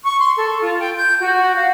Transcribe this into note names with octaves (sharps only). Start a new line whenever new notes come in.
C#6
C6
A4
F4
G5
G6
F#4
F5